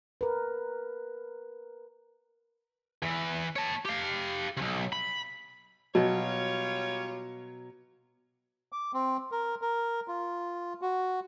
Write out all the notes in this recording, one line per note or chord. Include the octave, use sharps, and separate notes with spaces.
A#4 B4
E2 E3
C#5 A5
G4 F5
B1 C3
B5
B2 F#3 G3 F4 C#5
D6
C4
A#4
A#4
F4
F#4